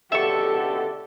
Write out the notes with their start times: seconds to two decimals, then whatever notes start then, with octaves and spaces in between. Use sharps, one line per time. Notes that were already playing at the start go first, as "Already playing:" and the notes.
0.12 C#2 B2 D3 G4 A4 E5 C#6